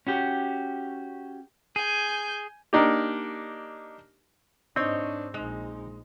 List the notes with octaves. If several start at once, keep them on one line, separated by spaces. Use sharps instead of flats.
C#4 F#4 G4
G#4 G#5 G6
A#3 D4 D#4 G4
G#2 C4 D4 D#4 C#5 D#5
A#1 G#3 D#4